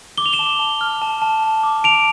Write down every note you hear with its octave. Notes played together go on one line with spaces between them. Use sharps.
D6 G7
F7
E7 G7
A5
A5
F6
A5
A5
A5
D6
A5 D7 F7